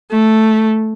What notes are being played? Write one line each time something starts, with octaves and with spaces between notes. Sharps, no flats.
A3